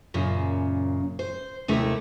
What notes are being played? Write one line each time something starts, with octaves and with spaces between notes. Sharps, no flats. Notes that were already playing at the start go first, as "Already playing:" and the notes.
F#2 A#2 C#3
C5
D#2 C3 A3 E4